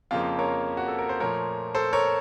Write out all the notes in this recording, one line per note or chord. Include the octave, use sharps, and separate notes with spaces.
F2 C#3 F3 A#3 F4
A#4 C#5
F#4
A4
A#4
C5
A#2 F3 A3 A#4 C#5
A4 C5
A#4 C#5